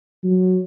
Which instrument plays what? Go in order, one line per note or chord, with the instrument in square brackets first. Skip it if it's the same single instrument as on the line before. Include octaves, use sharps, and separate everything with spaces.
[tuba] F#3